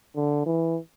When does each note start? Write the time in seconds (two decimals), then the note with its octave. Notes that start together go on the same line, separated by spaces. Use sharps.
0.16 D3
0.46 E3